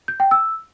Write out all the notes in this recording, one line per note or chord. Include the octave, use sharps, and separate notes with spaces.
G6
G5
E6